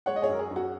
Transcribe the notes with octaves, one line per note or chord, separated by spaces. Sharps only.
G#3 C#5 F#5
D#5
G#4 C#5
F#2 A#4
G#4
F#2
F#4